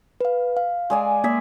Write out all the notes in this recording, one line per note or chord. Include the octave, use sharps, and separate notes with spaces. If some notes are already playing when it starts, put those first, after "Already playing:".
B4 F5
F5
G#3 D5 G#5
A#3 G#4 D5 E5 G#6 B6